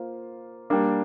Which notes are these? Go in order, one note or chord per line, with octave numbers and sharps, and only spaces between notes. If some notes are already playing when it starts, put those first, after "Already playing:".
Already playing: A#3 F4 C5
G3 A#3 D4